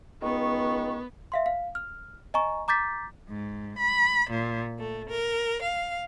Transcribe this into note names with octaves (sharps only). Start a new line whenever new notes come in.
C#2 D#3 B3 C#6
E5 F5 C6
F5
F6
D#5 G#5 A#5 C#6
A#5 D6 G6 A6 B6
G#2
B5
A#2
A3
A#4
F5